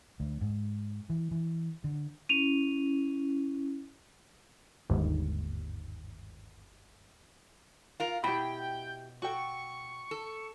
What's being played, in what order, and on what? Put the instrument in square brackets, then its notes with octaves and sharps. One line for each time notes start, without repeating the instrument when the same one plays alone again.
[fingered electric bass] D2
G#2
E3
E3
D3
[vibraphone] C#4 E4 [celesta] D#7 F7
[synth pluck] G1 D#2 G#2
[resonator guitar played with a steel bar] F4 A#4 [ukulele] F5
[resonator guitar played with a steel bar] B2 [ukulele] E4 G4 [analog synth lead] G5 [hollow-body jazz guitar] B5
[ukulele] F#4 A4 G5 [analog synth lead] C#6
[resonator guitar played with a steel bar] A4